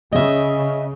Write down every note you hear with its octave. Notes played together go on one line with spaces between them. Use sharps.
C#3 D#5 E5